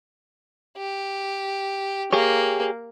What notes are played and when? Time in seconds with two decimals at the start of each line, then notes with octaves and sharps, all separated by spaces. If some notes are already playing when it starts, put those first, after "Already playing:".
0.78 G4
2.13 A#3 G4 G#4 C#5